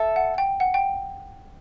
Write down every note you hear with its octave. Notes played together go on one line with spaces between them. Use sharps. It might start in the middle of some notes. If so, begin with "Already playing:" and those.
Already playing: A4 E5
F#5
G5
F#5
G5